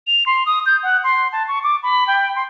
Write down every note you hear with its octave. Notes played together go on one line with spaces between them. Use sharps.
F7
C6
D#6
G6
F#5
C6
A5
C#6
D6
B5
G5
C6